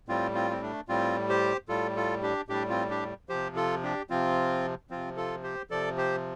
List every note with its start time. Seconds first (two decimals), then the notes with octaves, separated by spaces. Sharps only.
0.09 A2 G3 C4 F4
0.34 C4 F4
0.51 C4
0.62 A3 D4
0.88 A2 G3 C4 F4
1.29 G4 C5
1.69 A2 G3 F4 A4
1.96 F4 A4
2.22 D4 G4
2.49 A2 G3 D4 G4
2.69 C4 F4
2.90 D4 G4
3.29 C3 F3 G4 C5
3.56 F4 A4
3.83 D4 G4
4.10 C3 F3 C4 F4
4.90 C3 F3 C4 F4
5.17 F4 A4
5.43 G4 C5
5.70 C3 F3 A4 D5
5.97 G4 C5